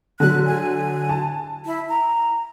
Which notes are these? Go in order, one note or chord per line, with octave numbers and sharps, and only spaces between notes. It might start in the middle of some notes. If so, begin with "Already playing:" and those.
D3 F#3 F#6
G#5
A5
E4
A#5